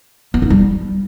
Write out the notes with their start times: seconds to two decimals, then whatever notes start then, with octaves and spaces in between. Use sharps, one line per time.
0.34 B3
0.42 D#4
0.50 G3